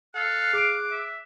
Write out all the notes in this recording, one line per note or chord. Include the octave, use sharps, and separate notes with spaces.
A4 F5 F#6
G#4 D6 C7 D7
E5